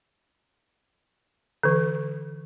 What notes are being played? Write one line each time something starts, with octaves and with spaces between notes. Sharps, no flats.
D3 E3